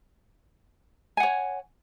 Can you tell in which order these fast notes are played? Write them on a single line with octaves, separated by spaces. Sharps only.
G#5 F#5 C#5